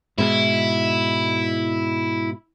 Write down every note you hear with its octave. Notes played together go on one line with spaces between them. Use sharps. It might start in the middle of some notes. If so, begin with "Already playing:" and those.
G#2 B2 G#3 E4